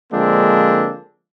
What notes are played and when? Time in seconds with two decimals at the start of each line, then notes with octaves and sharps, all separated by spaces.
0.13 D3 F3 G#3 A#3 C4 D4